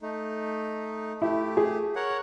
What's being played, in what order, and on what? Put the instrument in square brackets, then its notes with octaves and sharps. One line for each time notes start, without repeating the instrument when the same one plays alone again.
[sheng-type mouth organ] A3 D#4
[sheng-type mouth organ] A3 G4 [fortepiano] E4
[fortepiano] G#4
[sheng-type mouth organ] A#4 C#5 F#5